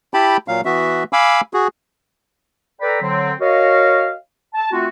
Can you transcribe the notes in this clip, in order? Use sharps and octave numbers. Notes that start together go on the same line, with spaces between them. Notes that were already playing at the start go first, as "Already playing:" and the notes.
E4 G4 G5 A5 B5
A#2 F#3 F5
E3 B3 F#4 E5
F5 G#5 B5 D6 E6
F#4 G#4
A4 B4 D5 G5 A#5 B5
D3 F#3 C4
F#4 A#4 C#5 D#5 F5
A5
A3 C4 F4 F#4